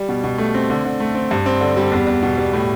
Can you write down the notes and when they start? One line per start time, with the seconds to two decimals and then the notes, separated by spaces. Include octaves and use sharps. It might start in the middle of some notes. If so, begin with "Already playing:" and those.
Already playing: G3
0.09 B2
0.24 B2
0.38 A3
0.54 C4
0.70 D3
0.85 D3
1.00 A3
1.15 C4
1.31 G2
1.46 C4
1.61 D3
1.77 G3
1.92 E2
2.07 E2
2.23 B2
2.37 G3
2.53 A2